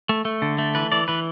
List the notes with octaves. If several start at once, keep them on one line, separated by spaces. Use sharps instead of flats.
A3
A3
D3
A3
E3 B4
E3 D5
E3 B4